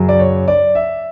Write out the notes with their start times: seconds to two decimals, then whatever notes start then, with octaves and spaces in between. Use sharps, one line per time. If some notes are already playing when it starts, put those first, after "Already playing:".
Already playing: F#2 C#3 F#3
0.09 D5
0.19 C#5
0.48 D5
0.75 E5